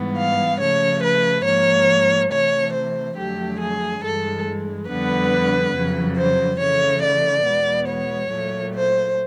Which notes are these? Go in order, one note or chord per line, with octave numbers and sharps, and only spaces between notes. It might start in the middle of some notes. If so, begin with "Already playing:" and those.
Already playing: G#2 E3 G3 B3
F5
C#3 F3 A3 C#5
B4
G#2 F3 A#3 C#5
C3 E3 A3 C#5
C5
F2 D3 F#3 A3 G4
G#4
G2 E3 G#3 A4
F2 D3 G3 B3 B4
F2 C#3 F#3
C5
C#3 E3 A3 C#5
D5
E2 B2 G#3 B3
C#5
A#2 F#3 A3
C5